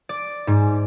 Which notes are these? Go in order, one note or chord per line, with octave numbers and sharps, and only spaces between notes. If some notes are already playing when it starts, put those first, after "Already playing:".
D5
G#2